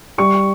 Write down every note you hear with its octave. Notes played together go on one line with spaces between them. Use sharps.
G3 C#6